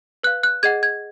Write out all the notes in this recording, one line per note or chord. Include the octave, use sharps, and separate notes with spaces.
B4 F5 F#6
F#6
G#4 D#5 F#5 G#6
G#6